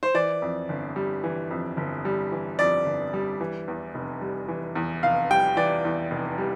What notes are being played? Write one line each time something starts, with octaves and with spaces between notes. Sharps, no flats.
C5
E3 D5
F2
G1
G3
E3
F2
G1
G3
E3
F2 D5
G1
G3
E3
E2
F1
G3
E3
E2
F1 F5
G3 G5
E3 D5
E2
F1
G3